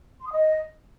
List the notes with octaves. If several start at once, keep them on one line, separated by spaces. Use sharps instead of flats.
C6
D#6
D#5